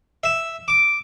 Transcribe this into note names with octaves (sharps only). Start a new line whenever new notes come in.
E5
D6